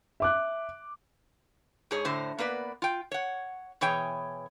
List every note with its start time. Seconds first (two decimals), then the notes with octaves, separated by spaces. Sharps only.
0.20 E5 D6 F#6
1.91 G#2 G#4 C#5
2.05 A2 D3 C5
2.38 A#3 B3 B4 D5
2.82 F4 G5
3.12 C#5 F#5
3.81 B2 E3 G#4 C#5 G5